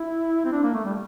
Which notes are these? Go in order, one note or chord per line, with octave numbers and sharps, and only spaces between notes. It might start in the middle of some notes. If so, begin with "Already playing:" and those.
Already playing: E4
C4
D4
A#3
A3
G3